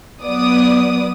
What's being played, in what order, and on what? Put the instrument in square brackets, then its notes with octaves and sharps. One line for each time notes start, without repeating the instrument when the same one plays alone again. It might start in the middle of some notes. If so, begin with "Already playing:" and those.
[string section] F#3 B3 D5 D#6